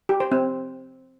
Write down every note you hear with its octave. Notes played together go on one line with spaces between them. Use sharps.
G4
C5
C4